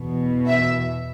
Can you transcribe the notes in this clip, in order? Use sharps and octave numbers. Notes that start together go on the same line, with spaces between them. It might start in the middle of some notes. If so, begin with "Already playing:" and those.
Already playing: E2 B2
E5